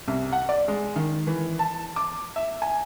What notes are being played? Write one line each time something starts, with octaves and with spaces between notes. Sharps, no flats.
C2
F#5
D5
G#3
D#3
E3
A5
D6
E5
G#5